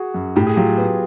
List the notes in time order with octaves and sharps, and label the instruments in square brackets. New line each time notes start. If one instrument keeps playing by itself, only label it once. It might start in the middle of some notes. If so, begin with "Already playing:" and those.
Already playing: [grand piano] F#4 G#4
[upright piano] F#2
[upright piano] A2 [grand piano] G4
[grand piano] G#4
[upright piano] F#3 [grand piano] F4 G4
[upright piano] B3